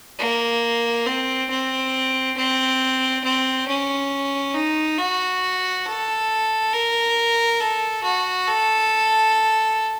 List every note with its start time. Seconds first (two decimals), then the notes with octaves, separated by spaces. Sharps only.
0.19 A#3
1.06 C4
1.50 C4
2.37 C4
3.24 C4
3.68 C#4
4.54 D#4
4.98 F#4
5.86 A4
6.73 A#4
7.60 A4
8.03 F#4
8.47 A4